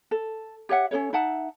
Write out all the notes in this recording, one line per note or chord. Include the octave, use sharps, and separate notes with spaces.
A4
G4 C#5 E5 F#5
C#4 D4 A4 C#5
D#4 E5 F#5 A5